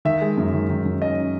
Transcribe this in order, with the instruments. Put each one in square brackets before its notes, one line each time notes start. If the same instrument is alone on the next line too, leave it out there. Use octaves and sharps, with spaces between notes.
[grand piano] D#3 E5
G#3
F#2
D#3
D#3
F#2
C#4 D#5
C#4